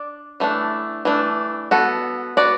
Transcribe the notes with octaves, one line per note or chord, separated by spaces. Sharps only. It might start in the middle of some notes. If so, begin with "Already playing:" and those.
Already playing: D4 D5
E3 A3 D4
E3 A3 D4
B3 F#4 A4
B3 F#4 D5